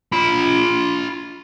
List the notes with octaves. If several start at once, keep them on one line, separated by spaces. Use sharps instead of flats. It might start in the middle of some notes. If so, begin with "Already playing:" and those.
F4 B5